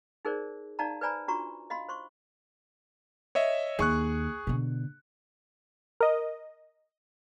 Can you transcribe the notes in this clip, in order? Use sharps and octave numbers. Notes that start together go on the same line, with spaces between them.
D#4 G#4 A#4 C5 D5
D#4 D5 F5 A5 A#5
B4 C5 D5 G#5 A#5 B5
D4 F4 F#4 A#5 C#6
D#5 F5 B5 C6
C5 C6 C#6
C#5 D#5 E5
D#2 G#4 C#6 F#6
B2 D3
A#4 D#5